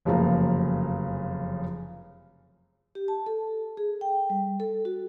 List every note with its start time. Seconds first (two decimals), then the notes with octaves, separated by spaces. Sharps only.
0.05 F1 F#2 C#3 F3 A#3 A#5
2.95 G4
3.08 A5
3.26 A4
3.77 G#4
4.01 G5
4.30 G3
4.60 A4
4.85 F#4